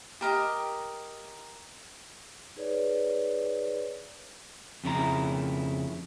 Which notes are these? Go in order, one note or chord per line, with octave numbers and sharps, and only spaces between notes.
G4 A#4 D#5
D#4 G#4 B4 C#5 D5
F2 C#3 E4 A#5